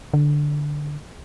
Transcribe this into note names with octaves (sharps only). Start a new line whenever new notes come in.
D3